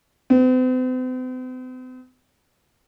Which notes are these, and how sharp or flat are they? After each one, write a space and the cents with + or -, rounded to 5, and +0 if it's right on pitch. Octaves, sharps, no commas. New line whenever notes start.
C4 -45